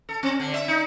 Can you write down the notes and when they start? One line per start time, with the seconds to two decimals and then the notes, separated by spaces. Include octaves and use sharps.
0.09 A4
0.23 C4
0.40 D3
0.54 E5
0.68 D#4